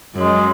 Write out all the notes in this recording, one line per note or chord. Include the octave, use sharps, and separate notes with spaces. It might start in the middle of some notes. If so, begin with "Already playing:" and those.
F#2 G#3